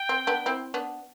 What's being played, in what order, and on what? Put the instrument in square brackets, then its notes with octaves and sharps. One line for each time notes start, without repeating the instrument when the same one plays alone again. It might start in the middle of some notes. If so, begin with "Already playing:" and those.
Already playing: [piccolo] G5
[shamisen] C4
B3 D4
C4 E4
B3 D4